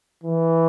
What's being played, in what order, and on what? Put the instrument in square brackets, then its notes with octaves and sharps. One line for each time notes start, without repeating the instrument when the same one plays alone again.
[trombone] E3